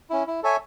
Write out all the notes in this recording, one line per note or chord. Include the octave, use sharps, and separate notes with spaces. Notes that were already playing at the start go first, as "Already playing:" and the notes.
C#4 E4
E4
A4 C#5 E5 G#5